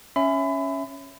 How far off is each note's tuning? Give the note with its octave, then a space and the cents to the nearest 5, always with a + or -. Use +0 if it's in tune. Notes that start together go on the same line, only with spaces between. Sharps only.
C#4 +0 E5 +0 B5 +30